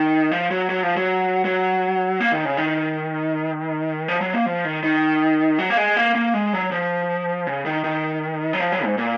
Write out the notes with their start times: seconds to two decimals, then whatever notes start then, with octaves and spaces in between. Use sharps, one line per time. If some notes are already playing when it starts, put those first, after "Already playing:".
Already playing: D#3
0.31 F3
0.51 F#3
0.70 F#3
0.83 F3
0.97 F#3
1.45 F#3
2.20 A#3
2.32 D#3
2.45 C#3
2.57 D#3
4.08 F3
4.21 F#3
4.33 A#3
4.46 F3
4.65 D#3
4.83 D#3
5.59 F#3
5.70 A#3
5.77 G#3
5.97 A#3
6.15 A#3
6.34 G#3
6.53 F#3
6.72 F3
7.47 C#3
7.66 D#3
7.84 D#3
8.53 F#3
8.60 F3
8.72 F#3
8.84 G#2
8.98 A#2